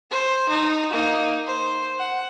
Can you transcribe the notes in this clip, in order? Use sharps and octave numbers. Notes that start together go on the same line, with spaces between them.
C5
D#4
A#3 D#4
C5
F#5